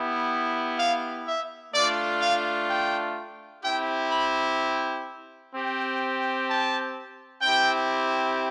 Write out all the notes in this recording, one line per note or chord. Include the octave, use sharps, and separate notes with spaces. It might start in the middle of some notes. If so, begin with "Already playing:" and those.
Already playing: B3 E4 G4
F5
E5
A3 D4 F4 D5
F5
G5
C4 E4 G4 G5
B5
C4 G4
A5
C4 E4 G4 G5